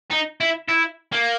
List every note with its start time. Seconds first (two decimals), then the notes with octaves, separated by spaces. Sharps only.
0.11 D#4
0.40 E4
0.69 E4
1.13 A#3